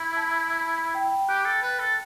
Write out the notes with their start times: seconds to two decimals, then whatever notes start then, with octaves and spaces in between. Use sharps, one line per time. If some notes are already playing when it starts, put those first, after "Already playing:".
Already playing: E4 B5 C6 E6
0.17 A5
0.27 B5
0.61 B5
0.78 B5
0.95 G5
1.12 G5
1.29 G4 F#6
1.46 A4
1.62 B4 A6
1.79 A4